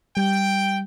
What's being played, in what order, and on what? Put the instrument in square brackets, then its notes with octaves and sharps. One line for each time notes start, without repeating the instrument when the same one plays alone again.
[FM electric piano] G3 [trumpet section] G5